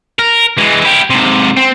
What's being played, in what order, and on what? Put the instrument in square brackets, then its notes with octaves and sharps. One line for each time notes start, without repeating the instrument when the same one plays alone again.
[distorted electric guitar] A#4
E3 G#3
E4 G4
G#2 C3
C4